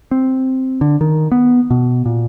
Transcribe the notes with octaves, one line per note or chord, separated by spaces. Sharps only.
C4
D3
D#3
B3
B2
A#2